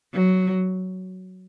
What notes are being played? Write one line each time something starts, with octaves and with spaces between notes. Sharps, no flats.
F#3